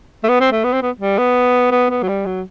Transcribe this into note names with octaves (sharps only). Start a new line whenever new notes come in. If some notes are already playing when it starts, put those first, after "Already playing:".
A3
B3
C4
A3
B3
C4
B3
G3
B3
B3
B3
F#3
G3
F#3